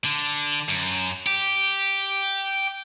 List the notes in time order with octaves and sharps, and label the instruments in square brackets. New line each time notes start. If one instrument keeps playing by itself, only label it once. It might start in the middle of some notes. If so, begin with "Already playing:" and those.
[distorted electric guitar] D3
F#2
G4